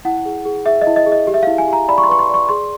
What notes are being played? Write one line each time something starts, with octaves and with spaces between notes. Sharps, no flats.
E4 F#5
G#4
G#4
G#4 E5
D#5
E4
D#5
G#4
D#5
G4
E5
E4 F5
G#5
G4 A#5
D5 B5
C#6
C6
B4 C#6
C6
D5 C#6
G#4 C6